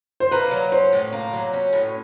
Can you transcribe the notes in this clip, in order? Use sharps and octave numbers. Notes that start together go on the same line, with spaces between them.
C5
A#3 B4
F#3
C#4 C5
A2
A#3
F#3
C#4
A2